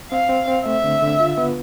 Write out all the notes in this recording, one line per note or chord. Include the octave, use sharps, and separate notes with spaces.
C4 F5
C4
C4
A3 E5
D3
D3
F4
B3